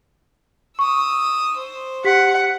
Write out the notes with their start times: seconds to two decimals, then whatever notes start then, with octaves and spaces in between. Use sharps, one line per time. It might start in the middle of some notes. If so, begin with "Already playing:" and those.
0.79 C#6 D#6 E6
1.57 C5
2.04 G4 F#5 B6